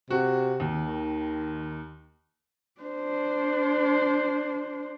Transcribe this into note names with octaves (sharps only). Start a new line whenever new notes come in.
C3 F#4
D#2
D#3
D4 C5